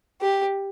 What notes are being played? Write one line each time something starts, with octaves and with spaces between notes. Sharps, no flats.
G4